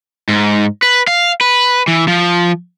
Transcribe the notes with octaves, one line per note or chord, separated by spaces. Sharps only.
G#2
B4
F5
B4
E3
F3